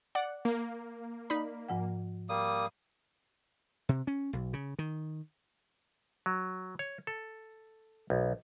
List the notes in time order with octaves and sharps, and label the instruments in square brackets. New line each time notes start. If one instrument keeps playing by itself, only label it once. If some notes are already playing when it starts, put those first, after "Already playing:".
[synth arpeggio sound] D5 F#5
[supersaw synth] A#3
[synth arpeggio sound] D#4 B5 [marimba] D5
[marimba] G#2 F3 F#5
[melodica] G3 A#3 D#6
[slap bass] C3
C#4
B1
C#3
D#3
[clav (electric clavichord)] F#3
C#5
A4
B1